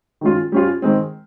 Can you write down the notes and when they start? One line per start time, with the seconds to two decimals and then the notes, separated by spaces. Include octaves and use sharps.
0.21 D#3 G#3 C#4 F4
0.52 G3 C#4 F4
0.82 D#3 G#3 C4